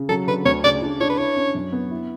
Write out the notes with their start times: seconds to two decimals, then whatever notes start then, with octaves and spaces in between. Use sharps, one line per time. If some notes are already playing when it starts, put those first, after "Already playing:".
Already playing: C#3
0.09 F#3 A4
0.27 D3 B4
0.45 D2 C#5
0.63 C#3 D5
0.82 D4
1.00 D4 C#5
1.10 B4
1.18 E4 C#5
1.36 C#4
1.55 F#2
1.72 B3
1.90 E4